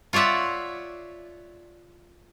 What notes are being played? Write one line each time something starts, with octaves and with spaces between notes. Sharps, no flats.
F4 C#5 D5 E5 F#5